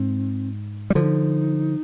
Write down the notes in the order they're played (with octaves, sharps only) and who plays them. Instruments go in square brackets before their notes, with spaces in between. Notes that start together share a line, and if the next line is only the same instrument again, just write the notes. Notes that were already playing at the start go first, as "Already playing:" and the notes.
Already playing: [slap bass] G#2 [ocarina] C4
[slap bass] G3
[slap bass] D3 F3 [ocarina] F4
[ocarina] D#4